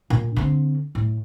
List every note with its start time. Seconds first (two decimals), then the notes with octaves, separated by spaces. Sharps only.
0.10 A#2
0.36 D3 C4
0.95 A2